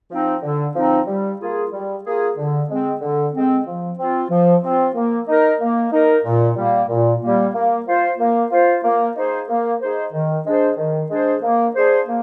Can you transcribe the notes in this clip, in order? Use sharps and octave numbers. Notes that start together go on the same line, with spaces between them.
F3 C4 D#4
D3
F3 C4 D#4
G3
A#3 F4 G#4
G3
A#3 F4 G#4
D3
G#3 C4
D3
G#3 C4
F3
C4 F4
F3
C4 F4
A#3
D#4 A#4
A#3
D#4 A#4
A#2
G3 A#3
A#2
G3 A#3
A#3
F4 C5
A#3
F4 C5
A#3
D#4 G#4 C5
A#3
D#4 G#4 C5
D#3
G#3 D4 G#4 C5
D#3
G#3 D4 G#4 C5
A#3
D4 G#4 C5
A#3